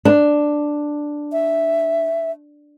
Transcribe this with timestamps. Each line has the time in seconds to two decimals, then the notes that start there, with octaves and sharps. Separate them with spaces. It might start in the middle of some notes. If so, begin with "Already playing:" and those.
0.05 D4
1.32 E5